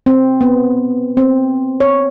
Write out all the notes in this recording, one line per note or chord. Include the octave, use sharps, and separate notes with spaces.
C4
B3
C4
C#5